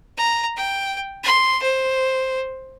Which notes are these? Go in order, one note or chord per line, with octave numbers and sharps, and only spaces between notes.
A#5
G5
C6
C5